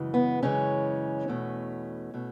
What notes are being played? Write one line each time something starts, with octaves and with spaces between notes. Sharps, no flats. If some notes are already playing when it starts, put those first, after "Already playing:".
Already playing: F#2 C#3 E3 G#3
B3
F#2 C#3 E3 G#3 C#4
E2 B2 A3
B2 A3